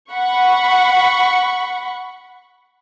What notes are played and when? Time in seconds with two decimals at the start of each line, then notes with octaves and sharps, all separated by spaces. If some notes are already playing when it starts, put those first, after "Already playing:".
0.12 F#5 B5 C#6